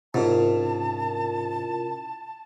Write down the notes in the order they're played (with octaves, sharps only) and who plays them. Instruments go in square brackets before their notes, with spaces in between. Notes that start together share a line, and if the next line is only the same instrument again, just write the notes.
[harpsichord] G#2 [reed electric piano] C3 C#4 [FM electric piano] E4 F4 A#4 [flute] A5